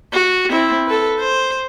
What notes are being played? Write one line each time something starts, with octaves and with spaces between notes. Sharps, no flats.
F#4
C4 E4
A4 B4
C5